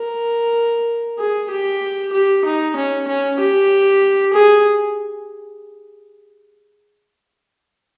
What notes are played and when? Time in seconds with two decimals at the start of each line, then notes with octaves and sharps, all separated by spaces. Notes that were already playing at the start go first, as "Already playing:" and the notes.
Already playing: A#4
1.18 G#4
1.50 G4
2.13 G4
2.44 D#4
2.76 C#4
3.07 C#4
3.39 G4
4.33 G#4